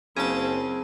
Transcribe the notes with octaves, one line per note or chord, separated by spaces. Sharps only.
F#1 C#3 C4 G#4 A5